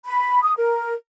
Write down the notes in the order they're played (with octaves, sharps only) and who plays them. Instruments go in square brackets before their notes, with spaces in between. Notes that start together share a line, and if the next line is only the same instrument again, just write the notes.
[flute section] B5
D#6
A#4